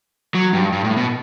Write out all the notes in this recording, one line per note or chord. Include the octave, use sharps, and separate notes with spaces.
F#3
G2
G2
A2
B2